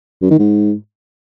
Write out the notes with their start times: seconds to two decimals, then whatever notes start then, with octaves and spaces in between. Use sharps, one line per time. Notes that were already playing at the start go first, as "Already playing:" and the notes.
0.22 F#2
0.31 D#3
0.39 G#2